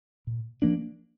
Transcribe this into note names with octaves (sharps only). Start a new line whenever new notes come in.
A#2
F3 A#3 D4